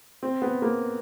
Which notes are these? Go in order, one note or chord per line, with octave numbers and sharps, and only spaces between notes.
C4
B3
A#3